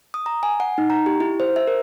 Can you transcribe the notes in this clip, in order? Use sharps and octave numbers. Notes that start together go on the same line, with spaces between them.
D#6
A#5
G#5
F#5
D#4
A#5
G4
E4
C5
E5
A#4